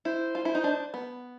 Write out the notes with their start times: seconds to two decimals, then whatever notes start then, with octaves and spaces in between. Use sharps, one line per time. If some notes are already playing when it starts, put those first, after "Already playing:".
0.05 E4 C5
0.35 F4
0.45 E4
0.55 D#4
0.64 D4
0.94 B3